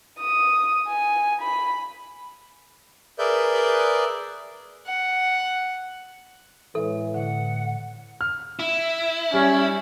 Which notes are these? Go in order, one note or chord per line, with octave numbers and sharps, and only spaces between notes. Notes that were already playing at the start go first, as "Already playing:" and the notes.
D#6
G#5
B5
G#4 A#4 B4 D5 E5 G6
F#5
A2 E3 G#3 A4 C#5
A2 D3 F#5
F6
E4
G3 C#4